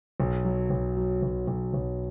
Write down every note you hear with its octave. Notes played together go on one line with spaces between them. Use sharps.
B1
F#3
B1
F#3
B1
B1
B1